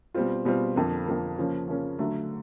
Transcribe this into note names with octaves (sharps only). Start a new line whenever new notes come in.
B2 G3 C4 F4
B2 G3 C4 F4
F2 D3 F3 A#3
F2 D3 F3 A#3
C#3 F3 A#3 C#4
C#3 F3 A#3 C#4
D3 F#3 A3